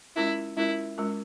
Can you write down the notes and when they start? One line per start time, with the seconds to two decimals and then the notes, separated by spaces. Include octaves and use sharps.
0.16 G#3 C#4 E4 F4 A#4
0.57 G#3 C#4 E4 F4 A#4
0.98 G#3 C#4 F4 A#4